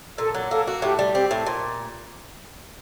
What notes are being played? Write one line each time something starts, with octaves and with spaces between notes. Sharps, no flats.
A#2 A4
F#3
A#3 A4
F#4
A2 G4
G3
C4 G4
A2
A#2